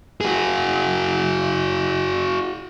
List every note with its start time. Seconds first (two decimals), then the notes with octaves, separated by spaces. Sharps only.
0.21 F#4 G#4